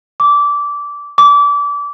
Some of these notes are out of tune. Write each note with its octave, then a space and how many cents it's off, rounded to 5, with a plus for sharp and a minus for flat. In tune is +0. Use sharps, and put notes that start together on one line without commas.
D6 -20
D6 -30